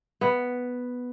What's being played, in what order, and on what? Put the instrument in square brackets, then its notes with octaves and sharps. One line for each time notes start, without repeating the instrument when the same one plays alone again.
[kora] B3